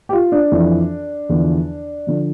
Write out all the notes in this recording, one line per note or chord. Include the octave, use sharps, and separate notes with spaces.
G4
F4
D4
F2 E3
E2 D3 F3
D3 F3